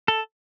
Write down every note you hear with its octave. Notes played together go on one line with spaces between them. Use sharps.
A4